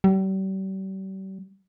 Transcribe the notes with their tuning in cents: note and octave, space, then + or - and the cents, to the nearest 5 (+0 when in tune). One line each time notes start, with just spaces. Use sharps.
G3 -40